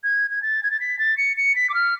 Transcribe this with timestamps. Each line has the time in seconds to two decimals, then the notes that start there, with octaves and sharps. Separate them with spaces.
0.04 G#6
0.31 G#6
0.42 A6
0.63 G#6
0.71 A6
0.80 B6
0.99 A6
1.17 C#7
1.37 C#7
1.55 B6
1.70 D6
1.74 F6